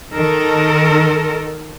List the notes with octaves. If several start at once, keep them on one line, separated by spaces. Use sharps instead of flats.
D#3 A4 A#4